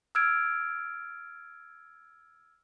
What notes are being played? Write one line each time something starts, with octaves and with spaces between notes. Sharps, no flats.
E6 F6 G#6 D7